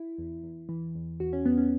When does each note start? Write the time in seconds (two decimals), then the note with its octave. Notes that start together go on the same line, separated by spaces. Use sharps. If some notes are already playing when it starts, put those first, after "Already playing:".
Already playing: E4
0.18 E2
0.44 E2
0.69 E3
0.95 E2
1.20 E2 F#4
1.33 C#4
1.45 E2 B3
1.57 C#4